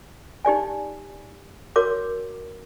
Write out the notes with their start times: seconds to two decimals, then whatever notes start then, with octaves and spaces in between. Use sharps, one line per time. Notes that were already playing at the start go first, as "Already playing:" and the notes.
0.45 D#4 G4 D5 G#5
1.76 F#4 A#4 C#5 D6